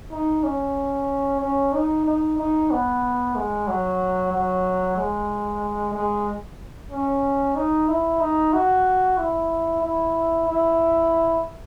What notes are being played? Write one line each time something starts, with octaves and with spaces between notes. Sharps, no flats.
D#4
C#4
C#4
D#4
D#4
D#4
B3
G#3
F#3
F#3
G#3
G#3
C#4
D#4
E4
D#4
F#4
E4
E4
E4